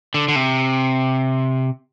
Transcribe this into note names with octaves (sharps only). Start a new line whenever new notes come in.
D3
D3
C3